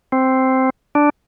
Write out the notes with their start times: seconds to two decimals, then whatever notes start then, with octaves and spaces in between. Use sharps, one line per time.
0.12 C4
0.95 D4